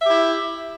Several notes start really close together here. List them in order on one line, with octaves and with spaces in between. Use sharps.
E5 G4 E4